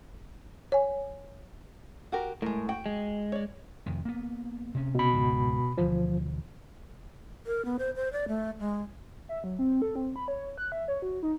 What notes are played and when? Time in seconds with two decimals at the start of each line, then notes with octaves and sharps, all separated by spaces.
0.72 C#5 G#5
2.12 F#4 G4 A#4
2.42 A2 G#3 A#4
2.69 F#4 G5
2.86 G#3
3.32 C#5 D5
3.86 F1 F2 D#3
4.05 A#3 B3
4.75 C3 C#4
4.95 B2 B5
5.13 C#2 G#2 C#3
5.78 D2 B2 E3 F3
7.46 A#4
7.65 B3
7.79 C5
7.96 C5
8.13 D5
8.28 A3
8.59 G#3
9.29 E5
9.44 F#3
9.59 C4
9.82 A4
9.96 C4
10.16 B5
10.28 C#5
10.58 F#6
10.72 E5
10.88 C#5
11.02 F#4
11.23 D#4